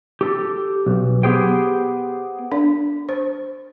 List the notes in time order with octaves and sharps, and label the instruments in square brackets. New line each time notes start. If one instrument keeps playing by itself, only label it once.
[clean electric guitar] G4 A4
B1
B3 G4 G#4 C5 G5
[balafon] D4
C5